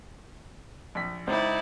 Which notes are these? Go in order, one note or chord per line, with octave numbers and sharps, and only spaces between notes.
A#1 B6
C#2 D#4 E4 C5 D5